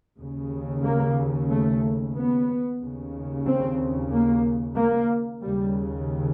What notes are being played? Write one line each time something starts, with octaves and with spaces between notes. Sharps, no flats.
D#2 C#3
A#3
A3
B3
D#2 C#3
C4
A#3
A#3
D#2 C#3 G3